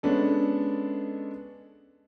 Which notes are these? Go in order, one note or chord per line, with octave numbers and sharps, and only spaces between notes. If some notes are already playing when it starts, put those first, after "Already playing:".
G#3 B3 C#4 D4 A4